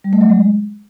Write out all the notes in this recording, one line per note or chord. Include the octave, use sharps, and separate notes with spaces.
G3
A3
F#3
G#3